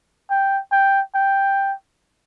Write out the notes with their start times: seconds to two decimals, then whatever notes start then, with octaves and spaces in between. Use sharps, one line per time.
0.30 G5
0.72 G5
1.15 G5